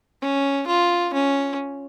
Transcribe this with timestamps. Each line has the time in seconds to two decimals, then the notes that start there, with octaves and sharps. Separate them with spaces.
0.22 C#4
0.67 F4
1.13 C#4